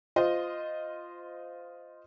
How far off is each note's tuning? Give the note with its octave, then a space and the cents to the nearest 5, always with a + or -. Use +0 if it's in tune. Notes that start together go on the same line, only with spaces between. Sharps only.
F4 +0 C5 -20 D#5 +0